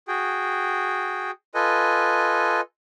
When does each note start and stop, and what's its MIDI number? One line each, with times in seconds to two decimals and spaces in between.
0.08 1.31 66
0.08 1.31 68
0.08 1.31 79
1.55 2.61 65
1.55 2.61 69
1.55 2.61 71
1.55 2.61 75
1.55 2.61 80